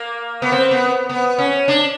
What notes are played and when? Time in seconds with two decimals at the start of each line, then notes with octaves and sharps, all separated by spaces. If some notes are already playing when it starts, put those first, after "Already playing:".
Already playing: A#3
0.42 B3
0.52 C4
0.71 B3
1.09 B3
1.38 C#4
1.68 D4